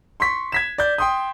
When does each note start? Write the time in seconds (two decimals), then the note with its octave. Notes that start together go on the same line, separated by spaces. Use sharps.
0.20 C6 C#6 B6
0.52 G#6 B6 E7
0.78 D5 G6
0.98 G5 C6 D#6